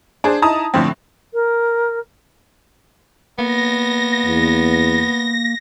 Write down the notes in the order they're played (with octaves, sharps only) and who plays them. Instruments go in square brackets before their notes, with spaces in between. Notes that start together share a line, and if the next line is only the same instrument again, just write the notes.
[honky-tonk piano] D4 G#4 C5
D#4 E4 A5 A#5 D#6
A2 D3 F3 C4
[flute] A#4
[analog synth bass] A#3 [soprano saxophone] B3 [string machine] A#6
[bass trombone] E2